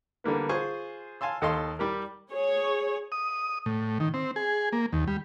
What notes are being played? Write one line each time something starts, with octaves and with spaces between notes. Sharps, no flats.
D3 G3 A#3 B3
F4 G#4 C5 G#5 C#6
F5 G#5 A5 C6 E6
D#2 A4 D#5 F5 C6
G3 G4 A#4
G#4 C#5
D#6
A2
D#3
C4
G#4
A#3
D#2
G3